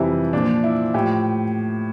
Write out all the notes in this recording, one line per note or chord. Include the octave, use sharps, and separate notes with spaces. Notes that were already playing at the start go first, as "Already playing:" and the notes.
Already playing: F2 C3 E3 G3 E4
A#2 F3 D4
E4
A2 F3 G4